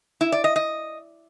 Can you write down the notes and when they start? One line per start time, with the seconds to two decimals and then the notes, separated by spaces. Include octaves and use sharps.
0.21 E4
0.32 D5
0.44 D#5
0.56 D#5